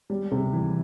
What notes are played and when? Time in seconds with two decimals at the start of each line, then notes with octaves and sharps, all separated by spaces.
0.10 G3
0.31 C3
0.53 E3